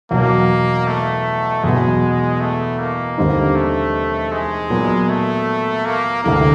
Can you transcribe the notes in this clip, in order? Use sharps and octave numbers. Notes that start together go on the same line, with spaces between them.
E2 B2 F#3 A#3
A3
E2 B2 F#3 G#3 B3
A3
A#3
D#2 D3 G3 C4 D#4
A3
G#3
A#2 F#3 B3
A3
A#3
D2 C3 E3 A3 A#3 D4